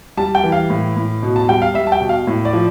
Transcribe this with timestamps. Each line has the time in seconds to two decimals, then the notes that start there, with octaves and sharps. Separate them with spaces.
0.17 G3 A5
0.35 G5
0.44 E3
0.52 F5
0.70 A2
0.96 A2
1.23 B2
1.36 A5
1.48 G3 G5
1.62 F5
1.74 G3 E5
1.87 A5
1.92 G5
2.00 B2
2.09 F5
2.27 A2
2.45 D5
2.53 F3